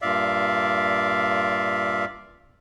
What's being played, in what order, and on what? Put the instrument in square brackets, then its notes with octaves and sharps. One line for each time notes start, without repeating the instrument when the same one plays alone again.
[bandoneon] G2 A#2 D5 E5 F5